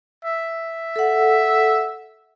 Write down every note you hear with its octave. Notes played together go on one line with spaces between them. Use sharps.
E5
A4 F#5